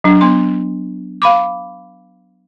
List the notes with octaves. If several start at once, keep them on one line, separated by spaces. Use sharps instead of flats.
F#3 D4
B3 C6
F5 B5 D6